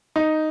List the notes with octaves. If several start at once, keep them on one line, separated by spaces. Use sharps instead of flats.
D#4